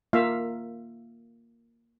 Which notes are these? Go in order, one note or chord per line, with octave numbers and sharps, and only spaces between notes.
A#3 F4 E5 F5